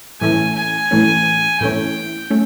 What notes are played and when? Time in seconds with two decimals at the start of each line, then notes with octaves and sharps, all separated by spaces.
0.21 A2 E3 A3 C#4 G#5
0.55 G#5
0.91 A2 E3 A3 C#4
1.61 A2 E3 A3 C#4 G5
2.30 A3 C#4